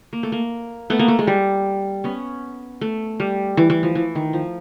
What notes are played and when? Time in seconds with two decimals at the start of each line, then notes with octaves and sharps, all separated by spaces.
0.13 A#3
0.23 A3
0.32 A#3
0.90 A3 B3
0.99 A#3
1.08 A3
1.19 G#3
1.27 G3
2.04 B3 C#4
2.81 A3
3.20 G3
3.57 E3
3.70 E3
3.83 F3
3.95 E3
4.15 D#3
4.33 F3